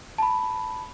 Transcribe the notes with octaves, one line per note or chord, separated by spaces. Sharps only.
A5 B5